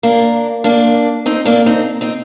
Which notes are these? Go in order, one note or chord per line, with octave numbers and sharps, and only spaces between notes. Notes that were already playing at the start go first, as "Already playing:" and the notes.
A#3 D4
A#3 D4
C4 D#4
A#3 D4
C4 D#4
C4 D#4